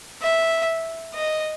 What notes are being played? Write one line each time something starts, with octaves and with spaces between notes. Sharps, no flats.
E5
D#5